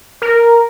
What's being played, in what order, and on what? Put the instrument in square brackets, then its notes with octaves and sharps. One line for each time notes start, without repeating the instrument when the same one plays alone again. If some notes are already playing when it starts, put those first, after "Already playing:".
[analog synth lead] A#4